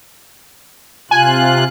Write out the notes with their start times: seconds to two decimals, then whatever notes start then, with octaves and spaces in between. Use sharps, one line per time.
1.11 C3 F4 G#5 F#6